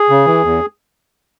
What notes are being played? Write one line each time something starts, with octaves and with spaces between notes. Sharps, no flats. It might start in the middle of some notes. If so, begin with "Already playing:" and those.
Already playing: G#4
C#3
E3
E2